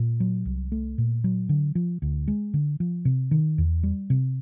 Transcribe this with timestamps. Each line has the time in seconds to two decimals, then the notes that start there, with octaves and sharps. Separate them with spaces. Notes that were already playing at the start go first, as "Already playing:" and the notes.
Already playing: A#2
0.20 F#3
0.45 C2
0.72 A3
0.98 A#2
1.24 F#3
1.49 D3
1.75 F3
2.02 D2
2.28 G#3
2.54 D3
2.80 F3
3.05 C3
3.31 D#3
3.58 E2
3.83 G3
4.10 C3